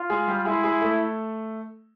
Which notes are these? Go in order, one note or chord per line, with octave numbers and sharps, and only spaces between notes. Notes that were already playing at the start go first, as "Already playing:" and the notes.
Already playing: F4
G#3 G#4
G3 G4
G#3 E4 G#4
G#3 G#4
A3 A4